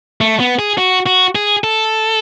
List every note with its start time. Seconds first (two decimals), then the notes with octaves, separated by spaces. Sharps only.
0.21 A3
0.40 B3
0.59 G#4
0.78 F#4
1.06 F#4
1.35 G#4
1.64 A4